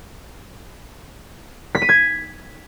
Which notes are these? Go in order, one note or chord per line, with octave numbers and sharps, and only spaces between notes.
B6
D#7
G#6